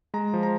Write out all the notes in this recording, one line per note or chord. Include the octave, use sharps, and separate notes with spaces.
G#3 A#5
F3
A#5